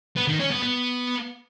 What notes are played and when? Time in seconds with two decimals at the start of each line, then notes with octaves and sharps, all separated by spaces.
0.16 B3
0.28 D#3
0.39 C#4
0.51 B3
0.63 B3